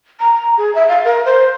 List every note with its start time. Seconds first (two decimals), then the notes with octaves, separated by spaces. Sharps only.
0.20 A#5
0.34 A#5
0.58 G#4
0.75 E5
0.88 F5
1.05 A#4
1.25 C5